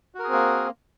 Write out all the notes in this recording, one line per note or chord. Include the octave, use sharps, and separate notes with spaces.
A#3 C4 F#4 G#4 A#4